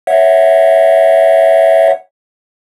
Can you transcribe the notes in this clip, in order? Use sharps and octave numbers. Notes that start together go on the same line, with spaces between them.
C#5 E5 F#5